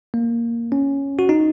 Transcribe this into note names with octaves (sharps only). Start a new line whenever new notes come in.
A#3
C#4
F#4
D#4